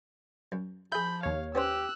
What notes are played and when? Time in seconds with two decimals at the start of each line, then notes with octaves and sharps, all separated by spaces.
0.52 F#2
0.92 F3 G#4 E5 B5 G6
1.23 D#2 C#5 F5
1.55 B3 C#4 G4 C5 E6 F#6